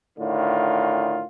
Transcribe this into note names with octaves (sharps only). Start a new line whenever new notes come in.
A2 D3 D#3 F4